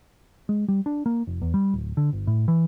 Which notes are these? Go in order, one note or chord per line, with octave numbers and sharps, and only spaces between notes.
G#3
G3
D4
A#3
F1
E2
G3
D1
D3
G1
A2
E3